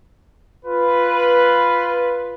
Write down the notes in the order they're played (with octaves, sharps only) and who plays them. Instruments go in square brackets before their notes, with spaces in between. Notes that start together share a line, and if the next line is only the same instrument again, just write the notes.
[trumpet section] F4 B4